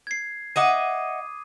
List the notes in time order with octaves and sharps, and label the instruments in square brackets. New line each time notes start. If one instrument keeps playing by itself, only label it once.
[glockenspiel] G#6 C7
[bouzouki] D#5 E5 F#5 [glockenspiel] D6 D#6 D#7